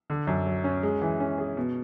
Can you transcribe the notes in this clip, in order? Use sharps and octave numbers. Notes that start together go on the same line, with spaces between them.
D3
F#2
F#3
C#4
G#3
E3
C#4
G#4
B2